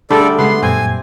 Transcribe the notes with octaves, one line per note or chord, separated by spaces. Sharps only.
D3 G3 A3 D4 G#4 A4 D5
C#3 G#3 B3 C6 C7
F#2 A#2 C4 G#5